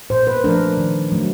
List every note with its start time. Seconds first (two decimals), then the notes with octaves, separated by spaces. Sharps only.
0.10 A#2 C5
0.27 B4
0.44 F3 A3 D4 A#4
0.78 D#3
1.12 F#3 A3 D4